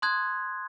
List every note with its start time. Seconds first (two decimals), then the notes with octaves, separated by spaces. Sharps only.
0.02 A5 C6 D#6 F#6 G#6